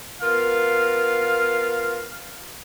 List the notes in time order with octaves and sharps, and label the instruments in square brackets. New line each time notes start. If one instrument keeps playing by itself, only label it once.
[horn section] B3 F4 A#4 F5